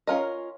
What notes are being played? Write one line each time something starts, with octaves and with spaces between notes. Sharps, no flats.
C#4 F4 A#4 D#5